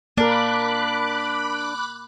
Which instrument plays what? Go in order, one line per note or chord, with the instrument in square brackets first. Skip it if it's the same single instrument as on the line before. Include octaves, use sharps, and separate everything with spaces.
[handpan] A#3 [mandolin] D4 A#4 [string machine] B5 D6 F#6